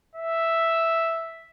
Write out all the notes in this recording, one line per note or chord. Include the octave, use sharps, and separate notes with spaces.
E5